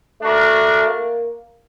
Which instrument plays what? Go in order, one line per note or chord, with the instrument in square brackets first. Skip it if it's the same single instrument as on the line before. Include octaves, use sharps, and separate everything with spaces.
[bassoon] A3 [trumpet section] D4 F#4 A#4
[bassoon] A#3